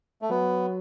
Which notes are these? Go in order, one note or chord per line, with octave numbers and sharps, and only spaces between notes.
A3
F#3 B3